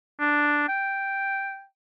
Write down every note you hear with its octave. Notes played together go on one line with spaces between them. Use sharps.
D4
G5